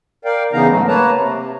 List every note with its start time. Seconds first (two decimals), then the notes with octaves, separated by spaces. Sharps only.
0.25 A#4 D5 F5 G5
0.53 C#3 E3 B3 D#4 F5 A#5
0.69 G#2 F#3 A3
0.88 A#3 B4 C#5 A5 A#5
1.14 C3